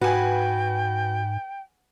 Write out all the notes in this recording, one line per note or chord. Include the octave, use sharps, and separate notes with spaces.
G#2 F#4 B4 G5 G#5